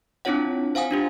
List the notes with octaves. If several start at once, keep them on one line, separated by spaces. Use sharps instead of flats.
C4 D4 E4 F4 C#5 F#5
C5 F5 F#5 G#5 D#6
D4 F4 G4